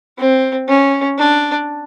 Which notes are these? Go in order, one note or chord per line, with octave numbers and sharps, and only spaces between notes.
C4
C#4
D4